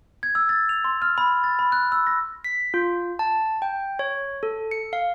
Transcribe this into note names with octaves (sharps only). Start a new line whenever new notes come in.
G#6
E6
A6
F7
C6
F6
B5
A6
B5
F#6
E6
A#6
B6
F4
A5
G5
C#5
A4
C#7
F5